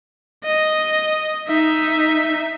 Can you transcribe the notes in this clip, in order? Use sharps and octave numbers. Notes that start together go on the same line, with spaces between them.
D#5
D#4 E5